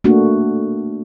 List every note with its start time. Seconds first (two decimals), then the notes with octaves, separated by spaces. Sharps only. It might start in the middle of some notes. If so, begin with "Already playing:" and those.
0.04 A3 A#3 D4 F#4